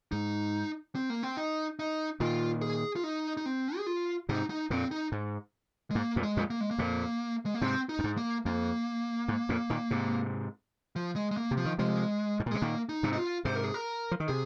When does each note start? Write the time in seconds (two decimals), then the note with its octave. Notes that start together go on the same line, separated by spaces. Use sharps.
0.12 G#2 D#4
0.95 C4
1.10 A#3
1.23 C4
1.37 D#4
1.79 D#4
2.20 A#2 D#3 F4
2.61 G#4
2.96 F4
3.04 D#4
3.37 D#4
3.46 C4
3.77 G#4
3.86 F4
4.29 G#2 C3 D#4
4.50 D#4
4.70 F2 A#2 C4
4.91 D#4
5.12 G#2
5.91 G#3
5.95 G#2 A#3
6.16 F2 A#2
6.23 G#3
6.37 F2 A#2
6.50 A#3
6.60 G#3
6.71 A#3
6.78 F2 A#2
7.46 G#3
7.54 A#3
7.61 G#2 C3 C4
7.89 D#4
7.99 F2
8.04 G#2
8.17 A#3
8.46 F2 A#3
9.28 G#2
9.49 F2 A#2
9.70 A#2 D#3
9.91 G#2 C3
10.96 F3
11.16 G#3
11.31 G#3
11.37 A#3
11.51 C3
11.57 F3
11.65 D#3
11.79 C3 F3 G#3
12.40 G#2
12.46 A#2
12.51 C3 G#3
12.62 A#2 D#3 A#3
12.89 D#4
13.03 G#2 C3
13.13 D#4
13.17 F4
13.45 G#2 C3 C5
13.55 A#4
13.64 G#4
13.74 A#4
14.11 F3
14.20 D#3
14.28 C3 G#4